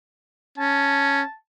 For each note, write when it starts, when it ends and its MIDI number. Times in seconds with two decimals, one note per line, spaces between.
0.58 1.22 61
0.58 1.34 81